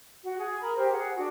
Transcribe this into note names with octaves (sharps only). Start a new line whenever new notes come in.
F#4
G#4
A#4 B5
G4 A#4 C5
G#4 F#5
D4 F#4